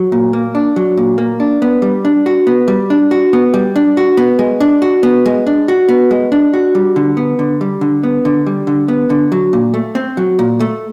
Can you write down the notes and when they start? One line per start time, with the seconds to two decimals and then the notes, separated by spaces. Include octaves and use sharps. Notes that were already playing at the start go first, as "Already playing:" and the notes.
Already playing: F#3
0.12 A#2
0.33 A#3
0.55 D4
0.76 F#3
0.97 A#2
1.18 A#3
1.40 D4
1.62 B3
1.82 G3
2.05 D4
2.26 F#4
2.47 B3
2.68 G3
2.90 D4
3.11 F#4
3.33 B3
3.54 G3
3.76 D4
3.97 F#4
4.17 B3
4.39 G#3
4.60 D4
4.82 F#4
5.03 B3
5.26 G#3
5.47 D4
5.68 F#4
5.89 B3
6.11 G#3
6.32 D4
6.53 F#4
6.75 G3
6.96 D3
7.17 B3
7.39 D3
7.61 G3
7.81 D3
8.03 B3
8.25 D3
8.46 G3
8.67 D3
8.88 B3
9.10 D3
9.32 F#3
9.53 A#2
9.74 A3
9.95 C4
10.17 F#3
10.39 A#2
10.60 A3